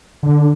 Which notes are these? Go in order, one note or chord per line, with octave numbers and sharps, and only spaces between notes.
D3